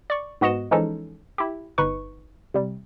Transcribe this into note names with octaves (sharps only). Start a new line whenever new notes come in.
D5 C#6
G#2 B3 F#4 D#5 C#7 E7
E3 F3 G#3 C#4 D#4 A4
E4 G4
G1 D#4 B4 C#6
C3 G3